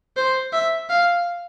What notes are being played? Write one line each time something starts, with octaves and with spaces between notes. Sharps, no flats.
C5
E5
F5